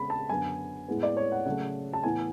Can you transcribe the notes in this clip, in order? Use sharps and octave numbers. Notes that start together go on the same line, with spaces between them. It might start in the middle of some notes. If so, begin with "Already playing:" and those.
Already playing: C#3 G#3 B3 B5
A5
F#2 D3 F#3 B3 G#5
A2 G#3 B3
D5
C#5
F#5
C#3 F#3 A3 F#5
A5
A2 E3 B3 G#5